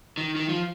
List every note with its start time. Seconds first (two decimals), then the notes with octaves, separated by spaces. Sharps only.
0.18 D#3
0.36 D#3
0.49 F3